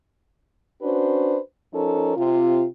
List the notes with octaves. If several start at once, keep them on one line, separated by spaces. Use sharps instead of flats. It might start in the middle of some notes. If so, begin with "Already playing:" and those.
C#4 D4 F#4 B4 C5
F3 C#4 D#4 A4 A#4
C3 F4